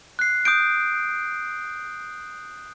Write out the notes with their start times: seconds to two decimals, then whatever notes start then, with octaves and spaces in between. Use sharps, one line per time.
0.19 F#6 C7
0.45 D#6 G6 D7